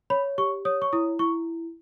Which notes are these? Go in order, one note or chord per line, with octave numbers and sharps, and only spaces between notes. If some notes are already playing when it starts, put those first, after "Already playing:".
C#5 B5
G4 C#6
C#5 D#6
C#6
E4 D#6
E4 C#6